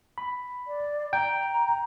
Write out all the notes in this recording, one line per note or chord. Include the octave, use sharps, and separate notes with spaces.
B5
D5
G5 A#5